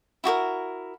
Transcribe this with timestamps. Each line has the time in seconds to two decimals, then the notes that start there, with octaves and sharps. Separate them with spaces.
0.24 E4 F#4 G4 A#4